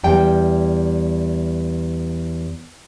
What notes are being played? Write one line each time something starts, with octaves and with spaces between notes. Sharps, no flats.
E2 G3 G5